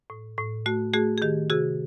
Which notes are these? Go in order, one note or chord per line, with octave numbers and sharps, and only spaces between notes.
A2
A2
A3 F#4
A3 F#4 G#4
G#4
D#3 G4
C3 F#4 G#4